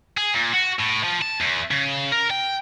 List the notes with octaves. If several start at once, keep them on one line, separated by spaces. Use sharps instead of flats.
G#4
A#2
F#4
A2
F3
A5
E2
C#3
A#4
G5